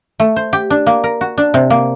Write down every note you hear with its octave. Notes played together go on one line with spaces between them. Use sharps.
A3
C5
G4
D4
A#3
A#4
F#4
D4
C3
A#3